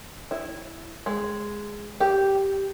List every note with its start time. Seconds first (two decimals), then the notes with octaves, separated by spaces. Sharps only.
0.31 E4
1.06 G#3
2.00 G4